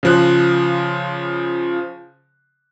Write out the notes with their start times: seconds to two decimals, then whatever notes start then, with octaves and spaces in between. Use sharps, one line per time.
0.03 C#3 F3 F#6